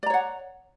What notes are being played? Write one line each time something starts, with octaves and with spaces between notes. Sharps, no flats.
C#5 D5 F#5 A#5